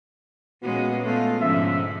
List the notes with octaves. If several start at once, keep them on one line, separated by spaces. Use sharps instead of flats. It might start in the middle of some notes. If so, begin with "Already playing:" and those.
A#2 G#3 B3 C#4 F#4
G#3 A3 B3 F4
G#2 B2 D3 F3 C#4 E5